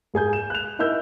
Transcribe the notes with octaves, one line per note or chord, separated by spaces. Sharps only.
G#2 G#4 G#5 G6
E7
F#6 F7
D#4 E4 A#4 E6 G6